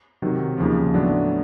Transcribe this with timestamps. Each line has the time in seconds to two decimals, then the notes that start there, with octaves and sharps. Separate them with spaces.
0.22 C3 D#3 F#3
0.58 D#2 C#3 F3
0.94 A2 F#3 B3 D4